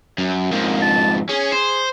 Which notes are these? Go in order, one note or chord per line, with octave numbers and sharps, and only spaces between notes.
F#2
F2 G#2 A#3
A5
C#4 G#4
C5